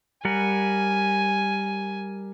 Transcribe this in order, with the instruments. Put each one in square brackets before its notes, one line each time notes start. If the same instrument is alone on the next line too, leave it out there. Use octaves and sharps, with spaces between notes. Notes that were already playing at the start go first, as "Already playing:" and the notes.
[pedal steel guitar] G3 A#4 F#5 [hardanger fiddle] G#5